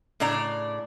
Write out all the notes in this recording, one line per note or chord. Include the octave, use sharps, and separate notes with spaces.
A2 C#3 D4 D5 A#5